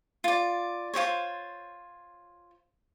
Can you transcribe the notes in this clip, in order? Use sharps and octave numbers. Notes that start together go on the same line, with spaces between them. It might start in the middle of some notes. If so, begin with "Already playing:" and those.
F4 D5
F4 G4 C5 C#5